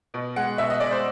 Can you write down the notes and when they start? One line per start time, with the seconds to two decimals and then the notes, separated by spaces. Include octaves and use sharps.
0.14 B2
0.36 G#3 F#5
0.58 B2 E5
0.70 D#5
0.80 G#3 D5
0.91 C5